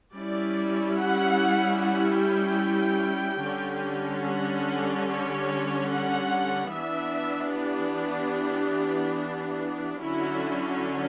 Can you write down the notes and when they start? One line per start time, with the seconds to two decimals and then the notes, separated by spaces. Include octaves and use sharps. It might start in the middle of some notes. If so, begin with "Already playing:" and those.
0.15 G3 C#4 E4 D5
0.97 F#5
1.79 F#5
2.21 G5
3.44 D3 G3 C#4
4.26 F#5
5.08 C#5
5.91 F#5
6.73 E3 B3 D4 E5
7.55 G4
10.01 D3 F#3 C#4 E4 F#4